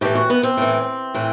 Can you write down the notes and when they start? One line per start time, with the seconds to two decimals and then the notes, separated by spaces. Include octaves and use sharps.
0.01 A2 E3 G4
0.15 F#4
0.30 B3
0.43 C4
0.57 A2 E3
1.15 A2 E3